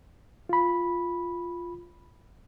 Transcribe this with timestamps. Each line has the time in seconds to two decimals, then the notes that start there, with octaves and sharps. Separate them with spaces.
0.49 F4 B5